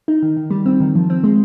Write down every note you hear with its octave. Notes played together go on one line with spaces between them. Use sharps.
D#4
D#3
D#3
G3
C4
D#3
F3
C4
G#3